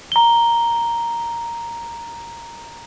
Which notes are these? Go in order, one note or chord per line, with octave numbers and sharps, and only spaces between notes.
A#5 G7